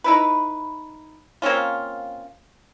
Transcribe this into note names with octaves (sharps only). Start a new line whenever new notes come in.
D#4 E4 B4
A#3 C4 C#4 F4